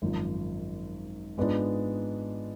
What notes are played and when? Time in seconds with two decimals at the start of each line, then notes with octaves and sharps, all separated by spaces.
0.02 G#1 F#2 F3
1.37 G#2 G#3 B3 D4 F4